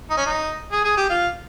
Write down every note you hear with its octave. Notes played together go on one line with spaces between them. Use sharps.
D#4
C#4
D#4
G#4
G#4
G4
F4